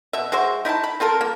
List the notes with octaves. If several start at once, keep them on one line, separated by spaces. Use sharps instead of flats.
B2 E5
G#3 F#4 C5 E5
D#4 E4 F5 A5
B5
C4 F4 A4 A#4
A#3